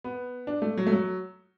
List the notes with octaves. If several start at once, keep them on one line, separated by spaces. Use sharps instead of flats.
B3
D4
A3
F#3
A3
F#3